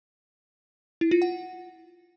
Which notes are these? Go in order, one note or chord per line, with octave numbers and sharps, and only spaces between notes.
E4
F4
F#5